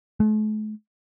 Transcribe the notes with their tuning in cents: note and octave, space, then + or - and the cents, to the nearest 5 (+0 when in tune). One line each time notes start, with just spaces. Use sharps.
A3 -45